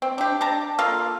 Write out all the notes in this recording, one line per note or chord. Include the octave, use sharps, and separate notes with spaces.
C4
D4 G4
D4 A5 A#5
A#3 F4 A4 F5